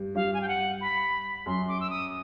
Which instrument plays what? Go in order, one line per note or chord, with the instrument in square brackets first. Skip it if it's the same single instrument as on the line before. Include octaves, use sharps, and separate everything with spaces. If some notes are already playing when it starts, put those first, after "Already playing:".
Already playing: [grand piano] G2 G3
[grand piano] G2 G3 [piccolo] F5
[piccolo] G#5
G5
F#5
B5
[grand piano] F#2 F#3 [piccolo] C6
[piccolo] D6
E6
D#6